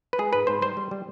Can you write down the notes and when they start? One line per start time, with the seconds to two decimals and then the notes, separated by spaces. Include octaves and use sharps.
0.13 B4
0.19 G#3 G#4
0.33 G#2 B4
0.47 G#2 C5
0.62 G3 C5
0.77 G3
0.91 G3